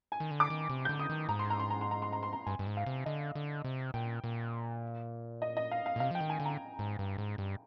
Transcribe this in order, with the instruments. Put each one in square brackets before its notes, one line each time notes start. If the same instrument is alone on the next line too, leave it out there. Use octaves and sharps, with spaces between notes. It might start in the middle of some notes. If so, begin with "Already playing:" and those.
[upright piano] G#5
[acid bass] D#3
D3
[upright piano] D6
[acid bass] D#3
C3
[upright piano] G6
[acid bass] D3
[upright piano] D#6
[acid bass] D#3
[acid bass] G#2 [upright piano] A#5
[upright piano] C6
A#5
C6
A#5
C6
A#5
C6
A#5
C6
A#5
[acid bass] G2 [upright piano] G#5
[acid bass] G2
G#2
[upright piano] F5
[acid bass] C3
[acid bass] D3 [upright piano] D#5
[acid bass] D3
C3
[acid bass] A#2 [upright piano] G5
[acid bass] A#2
[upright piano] D#5
D#5
F5
F5
[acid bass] A#2
[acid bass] C3 [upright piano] F5
[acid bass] F3 [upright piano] G5
[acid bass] D#3
[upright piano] G#5
[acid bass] D3
[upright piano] A#5
[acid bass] G#2
G2
G#2
G2